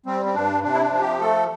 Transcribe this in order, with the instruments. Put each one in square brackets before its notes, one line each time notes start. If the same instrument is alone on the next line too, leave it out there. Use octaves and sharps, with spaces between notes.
[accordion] G3 C4
C4
G2 D4
C3 D4
E4
D4
F3
G4
A3 A4